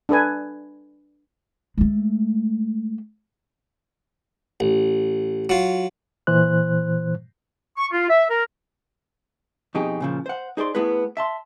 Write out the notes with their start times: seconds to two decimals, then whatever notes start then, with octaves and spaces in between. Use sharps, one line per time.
0.09 D4 A4 B4 G#5
1.77 G#3 A3
4.60 A1
5.49 F#3 F4
6.27 A#2 E3 C5 F#6
7.78 C#6
7.92 F4
8.10 E5
8.29 A#4
9.75 F2 B2 D#4 G4 G#4
10.00 A#2 C#3 F3
10.26 C5 F#5
10.57 D#4 G#4 C5 D5 C6
10.75 A3 B3 E4 G#4 B4
11.17 E5 A5 C6